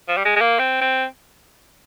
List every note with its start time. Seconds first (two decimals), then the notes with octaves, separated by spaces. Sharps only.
0.08 F3
0.17 G3
0.25 G#3
0.36 G#3
0.41 A#3
0.59 C4
0.81 C4